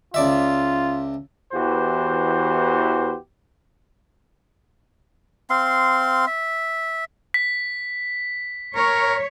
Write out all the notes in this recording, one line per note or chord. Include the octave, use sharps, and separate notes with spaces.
C#2 F4 D5 E5
E2 E3 F#4 G4 C5
C4 F5 C6
E5
B6
A#4 C#5